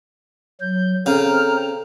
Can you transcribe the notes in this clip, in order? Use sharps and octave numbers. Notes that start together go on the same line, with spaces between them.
F#3 G6
C#3 C4 A4 C5 A#5 F6